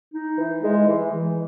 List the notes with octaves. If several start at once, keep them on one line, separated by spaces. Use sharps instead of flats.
D#4
E3
G#3
E3
E3